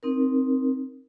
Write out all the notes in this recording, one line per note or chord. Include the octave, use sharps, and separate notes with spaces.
C4 D#4 A#4